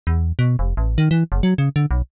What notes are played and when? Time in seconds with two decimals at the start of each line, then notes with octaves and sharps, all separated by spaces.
0.07 E2
0.39 B2
0.59 F1
0.77 A1
0.98 D#3
1.11 E3
1.32 F#1
1.43 F#3
1.58 C#3
1.76 D3
1.91 B1